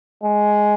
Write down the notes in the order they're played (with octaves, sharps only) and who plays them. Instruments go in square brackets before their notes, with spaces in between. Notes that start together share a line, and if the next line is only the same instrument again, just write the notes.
[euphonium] G#3